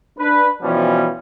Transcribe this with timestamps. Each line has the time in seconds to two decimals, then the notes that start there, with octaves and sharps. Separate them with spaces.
0.18 D4 B4
0.62 B2 E3 F3 G3 C#4